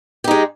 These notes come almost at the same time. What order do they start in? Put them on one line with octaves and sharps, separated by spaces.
G4 D#4 G#3